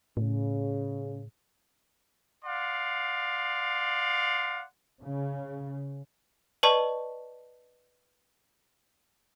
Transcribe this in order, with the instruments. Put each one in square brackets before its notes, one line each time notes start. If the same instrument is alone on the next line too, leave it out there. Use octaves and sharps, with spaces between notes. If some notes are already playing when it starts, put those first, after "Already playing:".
[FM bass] A2 [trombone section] C#3
[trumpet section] D5 F5 F#5 C6
[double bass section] C#3
[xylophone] B4 D5 D#5 A5 C#6